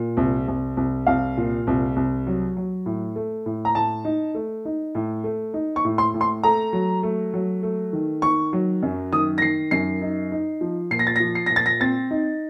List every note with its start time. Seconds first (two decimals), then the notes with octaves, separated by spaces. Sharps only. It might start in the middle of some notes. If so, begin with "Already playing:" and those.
Already playing: A#2
0.17 C2
0.48 C2
0.77 C2
1.07 C2 F5
1.37 A#2
1.67 C2
1.96 C2
2.27 F#3
2.57 F#3
2.86 A2
3.16 A3
3.46 A2
3.65 A#5
3.75 A2 A5
4.05 D#4
4.34 A3
4.65 D#4
4.95 A2
5.24 A3
5.54 D#4
5.76 C#6
5.85 A2
5.98 C6
6.14 A2
6.21 C6
6.43 A3 A#5
6.73 F#3
7.03 A3
7.34 F#3
7.63 A3
7.93 D#3
8.22 D#3 C#6
8.53 F#3
8.83 F#2
9.13 D#3 D#6
9.38 A#6
9.42 D#3 C7
9.71 F#2 C7
10.01 D#4
10.32 D#4
10.61 F3
10.91 A#2 C7
10.99 A#6
11.07 A6
11.16 A#6
11.20 F3
11.35 C7
11.46 A#2 A#6
11.56 A6
11.66 A#6
11.80 C4 A6
12.11 D#4